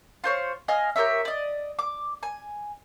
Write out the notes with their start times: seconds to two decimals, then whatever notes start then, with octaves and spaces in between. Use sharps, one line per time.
0.24 F4 C5 C#5
0.68 D#5 F5 G#5 F6
0.96 G4 A#4 C#5 E5
1.25 D5 D#5
1.79 D6
2.23 G#5